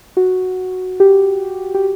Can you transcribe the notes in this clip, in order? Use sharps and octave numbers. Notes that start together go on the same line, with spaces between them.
F#4
G4
G4